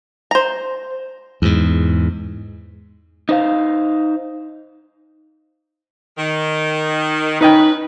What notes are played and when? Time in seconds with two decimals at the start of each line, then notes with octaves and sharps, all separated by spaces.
0.31 C5 A#5
1.42 E2 G#2
3.29 D#4 C5 F5
6.18 D#3
7.41 C#4 D#4 B4 D#5 G5